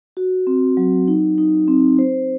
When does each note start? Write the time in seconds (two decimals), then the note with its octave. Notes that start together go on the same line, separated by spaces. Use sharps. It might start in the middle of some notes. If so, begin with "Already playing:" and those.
0.17 F#4
0.47 C4
0.77 F#3
1.08 D#4
1.38 D#4
1.68 C4
1.99 C5